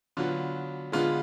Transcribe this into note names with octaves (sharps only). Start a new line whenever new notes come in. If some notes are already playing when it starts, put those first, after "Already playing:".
D3 F#3 B3 F4
D3 G#3 B3 F4